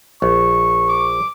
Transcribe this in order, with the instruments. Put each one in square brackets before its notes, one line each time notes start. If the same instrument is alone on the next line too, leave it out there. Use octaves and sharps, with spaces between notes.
[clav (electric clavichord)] A#1 [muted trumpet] C#6
[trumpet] D6